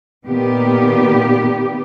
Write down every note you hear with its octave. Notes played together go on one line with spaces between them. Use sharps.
A#2 D#3 B3 G4